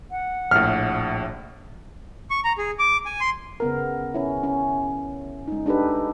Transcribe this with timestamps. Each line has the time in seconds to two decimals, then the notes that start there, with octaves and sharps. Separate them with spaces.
0.11 F#5
0.51 A#1 A2 F6
2.30 C#6
2.44 A#5
2.58 G#4
2.79 D6
3.06 G#5
3.21 C6
3.60 C#3 B3 A#4
4.14 C#4 E4
4.43 C#4
5.48 G#3 D#4
5.66 D4 D#4 G4 A4 B4